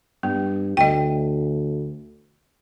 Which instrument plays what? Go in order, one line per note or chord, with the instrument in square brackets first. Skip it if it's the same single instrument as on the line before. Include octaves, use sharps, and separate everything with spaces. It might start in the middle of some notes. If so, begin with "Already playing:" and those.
[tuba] G2 [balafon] B3
[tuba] D2 [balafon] D#5 G5